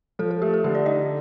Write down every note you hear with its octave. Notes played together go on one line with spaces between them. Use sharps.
F3 A4
A4
A3 G4
A4
D3 G4
D5
D#4 D#5